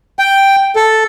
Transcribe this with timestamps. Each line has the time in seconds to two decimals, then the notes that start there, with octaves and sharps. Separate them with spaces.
0.19 G5
0.76 A4